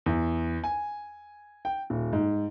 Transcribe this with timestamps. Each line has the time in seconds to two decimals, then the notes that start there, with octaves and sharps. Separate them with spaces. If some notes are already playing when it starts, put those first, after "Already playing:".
0.06 E2
0.64 G#5
1.65 G5
1.90 D#1
2.13 G#2